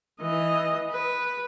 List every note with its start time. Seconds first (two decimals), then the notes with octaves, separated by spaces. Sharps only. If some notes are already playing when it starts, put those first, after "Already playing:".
0.21 E3 D#5
0.91 B4